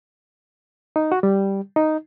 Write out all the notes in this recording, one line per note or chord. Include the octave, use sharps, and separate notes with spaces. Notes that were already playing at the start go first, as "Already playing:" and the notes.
D#4
F#4
G3
D#4